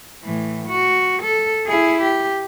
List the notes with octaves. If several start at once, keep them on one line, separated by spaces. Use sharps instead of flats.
A2 E3
F#4
A4
E4 G#4
G4